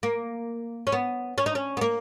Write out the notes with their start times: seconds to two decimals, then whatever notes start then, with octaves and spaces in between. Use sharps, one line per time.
0.03 A#3
0.87 C#4
0.92 B3
1.38 C#4
1.46 D#4
1.55 C#4
1.77 B3
1.81 A#3